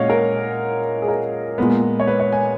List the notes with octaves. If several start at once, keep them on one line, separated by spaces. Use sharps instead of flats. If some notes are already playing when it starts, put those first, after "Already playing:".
Already playing: A#2 G#3 C#4 C#5 D#5 F5 F#5
A#4
G#4
A#4
A#2 G#3 B3
C#5
B4
C#5
G#5